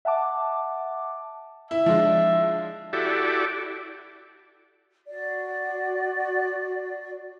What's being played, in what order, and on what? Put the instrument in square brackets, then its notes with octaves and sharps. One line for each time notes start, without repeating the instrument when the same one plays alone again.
[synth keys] E5 F#5 A5 D6
[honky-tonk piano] E4 [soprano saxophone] E5
[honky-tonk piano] F3 G#3 D4
[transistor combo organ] E4 F#4 G4 A4 D5
[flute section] F#4 D5